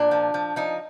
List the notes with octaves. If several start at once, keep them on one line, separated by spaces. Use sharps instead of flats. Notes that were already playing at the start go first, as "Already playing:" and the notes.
Already playing: A#2 D4
F3
F3
F3 D#4